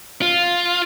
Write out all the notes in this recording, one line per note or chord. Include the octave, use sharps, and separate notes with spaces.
F4